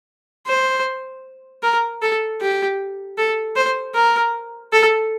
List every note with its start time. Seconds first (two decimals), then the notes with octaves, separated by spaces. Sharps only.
0.47 C5
1.63 A#4
2.02 A4
2.41 G4
3.18 A4
3.56 C5
3.95 A#4
4.72 A4